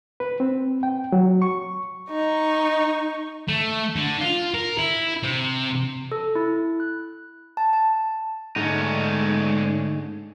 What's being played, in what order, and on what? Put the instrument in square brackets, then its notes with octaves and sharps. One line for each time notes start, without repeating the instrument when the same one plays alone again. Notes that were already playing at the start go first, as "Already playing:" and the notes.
[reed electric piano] B4
C4
G5
F#3
C#6
[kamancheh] D#4 C#6
[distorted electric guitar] A3
D3
F4
A#4
E4
C3
[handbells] A4
E4
F#6
A5
A5
[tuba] G#2 [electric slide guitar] D3 G#3 A3 [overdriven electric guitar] C#4 D#4